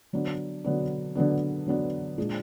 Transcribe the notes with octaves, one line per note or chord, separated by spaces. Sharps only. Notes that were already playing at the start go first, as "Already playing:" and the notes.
D3 F#3 B3 D4
D3 F#3 B3 D4
D3 F#3 B3 D4
D3 F#3 B3 D4
A#2 G#3 D4 G#4